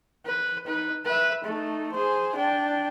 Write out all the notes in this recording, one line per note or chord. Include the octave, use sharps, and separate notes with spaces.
B4
D#4 B4
B4 E5
A3 D#4
G#4 C5
D4 G5